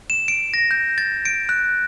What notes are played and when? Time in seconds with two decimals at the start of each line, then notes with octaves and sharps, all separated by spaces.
0.10 E7
0.28 D7
0.54 A#6
0.71 G6
0.98 A6
1.25 D7
1.49 F#6